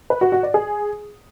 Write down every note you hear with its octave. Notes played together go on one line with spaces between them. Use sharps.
B4
F#4
F#4
D5
G#4